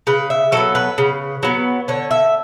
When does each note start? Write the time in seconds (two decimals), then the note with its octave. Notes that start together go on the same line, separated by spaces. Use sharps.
0.07 C#3 B4
0.30 E5
0.52 F#3 B3 A4
0.75 B4
0.98 C#3
1.43 F#3 B3
1.88 D3 C#5
2.11 E5